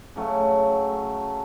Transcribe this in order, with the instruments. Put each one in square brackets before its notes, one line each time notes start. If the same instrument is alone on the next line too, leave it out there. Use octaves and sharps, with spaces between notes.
[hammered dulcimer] C#3 F#3 A3